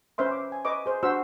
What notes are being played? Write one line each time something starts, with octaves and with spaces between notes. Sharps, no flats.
C#4 B4 C5 E5 C6
D6
G#5
B4 D#5 C#6 D6
G#4 C5
D4 F#4 C5 E6